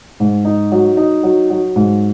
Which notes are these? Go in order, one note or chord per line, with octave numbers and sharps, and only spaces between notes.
G#2
D#4
F#3
D#4
F#3
F#3
G#2